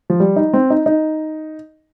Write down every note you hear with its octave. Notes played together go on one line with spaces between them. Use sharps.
F3
G3
D#4
C4
D#4
D#4